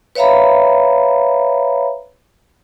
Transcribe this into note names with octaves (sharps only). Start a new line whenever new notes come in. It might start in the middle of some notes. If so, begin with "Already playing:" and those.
B4 C#5 E5 F5 A#5 B5